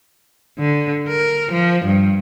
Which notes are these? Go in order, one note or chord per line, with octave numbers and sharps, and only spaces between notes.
D3
A#4
F3
G2